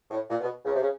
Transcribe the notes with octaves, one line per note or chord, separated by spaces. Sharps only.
A2
A#2
B2
C#2 C#3
C3
C#3